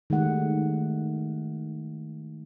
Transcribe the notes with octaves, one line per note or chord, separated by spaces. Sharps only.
D#3 G#3 A3 G4 F#5